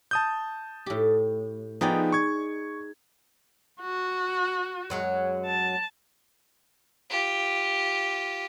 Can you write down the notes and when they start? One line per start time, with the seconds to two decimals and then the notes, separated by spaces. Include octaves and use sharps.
0.11 A5 D#6 G6
0.86 A2 G4
1.81 F3 B3 D#4 G#4 D5 G5
2.12 C#6 G#6
3.81 F#4
4.90 F#2 F#3 G#3
5.46 A5
7.10 F4 G4